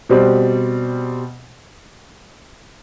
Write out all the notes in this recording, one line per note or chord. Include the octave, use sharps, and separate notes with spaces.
B2 G3 C4